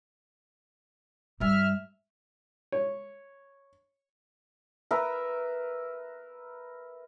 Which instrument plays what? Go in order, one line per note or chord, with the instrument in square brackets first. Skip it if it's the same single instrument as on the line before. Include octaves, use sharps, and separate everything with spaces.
[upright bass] G2 G3 [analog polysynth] E5 F6
[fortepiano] C#5
[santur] A#4 B4 E5